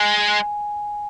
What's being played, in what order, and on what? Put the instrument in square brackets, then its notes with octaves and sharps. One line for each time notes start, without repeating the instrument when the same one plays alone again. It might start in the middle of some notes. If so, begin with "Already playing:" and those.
Already playing: [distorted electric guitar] G#3 [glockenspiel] G#5